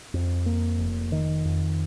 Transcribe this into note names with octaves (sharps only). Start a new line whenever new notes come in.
F2
A#3
F1
D#3
F2